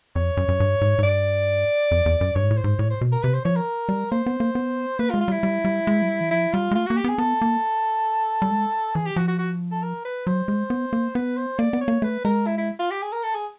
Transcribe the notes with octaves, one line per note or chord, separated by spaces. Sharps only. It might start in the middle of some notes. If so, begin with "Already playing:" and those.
F2 C#5
F#2
F#2
G2
G#2
G#2
G2 D5
F2
E2
F#2
G2 C#5
G#2
A2
C5
G#2
A2 C#5
C5
B2
A#4
C3 B4
C5
F3 C#5
A#4
G3
A#3 C5
B3
A#3
B3
A#3 B4
F4
G#3
F4
G3 E4
G3
G3
G#3
F#3
G3
E3
F3 E4
G3 F4
G#3
A3 F4
A#3 F#4
G4
B3 G#4
B3 A4
A#3
G3
G#3
E3 G#4
G4
F3 F#4
F#4
F#4
A4
A#4
B4
F#3 C5
G#3
B3
A#3
B3 B4
C5
A#3 D5
B3
C#5
A#3
A3 B4
G#3 A#4
E4
E4
F4
G4
G#4
A#4
A4
G#4